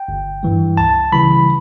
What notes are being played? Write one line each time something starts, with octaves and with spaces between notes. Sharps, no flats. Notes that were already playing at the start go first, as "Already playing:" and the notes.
Already playing: G5
G1
G2 E3 G3
C#2 A5
C#3 E3 G3 B5